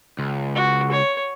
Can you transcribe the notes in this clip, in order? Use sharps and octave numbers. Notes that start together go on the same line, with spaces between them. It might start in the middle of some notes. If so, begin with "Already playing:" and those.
C#2
F#4
C#5